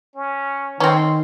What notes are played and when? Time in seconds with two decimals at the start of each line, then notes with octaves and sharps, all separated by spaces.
0.16 C#4
0.80 D#3 C4 C#4 C6